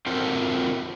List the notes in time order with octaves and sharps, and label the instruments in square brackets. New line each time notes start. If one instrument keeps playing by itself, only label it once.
[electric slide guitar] C4 F4 F#4 A4 A#4 C5